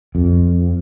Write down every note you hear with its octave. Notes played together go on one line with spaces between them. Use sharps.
F2